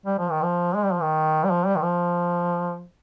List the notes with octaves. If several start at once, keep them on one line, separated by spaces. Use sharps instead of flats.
G3
F3
D#3
F3
G#3
G3
F3
D#3
G3
F3
G3
D#3
F3